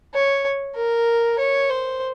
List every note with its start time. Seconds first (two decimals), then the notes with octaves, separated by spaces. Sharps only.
0.14 C#5
0.76 A#4
1.39 C#5
1.70 C5